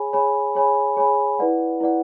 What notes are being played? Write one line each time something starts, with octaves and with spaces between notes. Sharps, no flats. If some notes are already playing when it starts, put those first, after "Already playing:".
Already playing: G#4 C#5 G#5 B5
G#4 C#5 G#5 B5
G#4 C#5 G#5 B5
G#4 C#5 G#5 B5
E4 B4 D5 F#5
E4 B4 D5 F#5